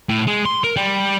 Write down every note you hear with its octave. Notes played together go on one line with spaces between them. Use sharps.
A2
G#3
C6
A#4
G3